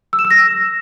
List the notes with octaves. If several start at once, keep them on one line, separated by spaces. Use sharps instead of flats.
E6
E7
E6
A#6